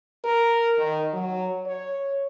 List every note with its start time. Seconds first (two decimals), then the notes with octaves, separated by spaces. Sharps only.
0.24 A#4
0.78 D#3
1.13 F#3
1.66 C#5